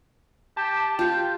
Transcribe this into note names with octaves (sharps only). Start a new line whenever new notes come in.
G4 A5
F4 G4 G5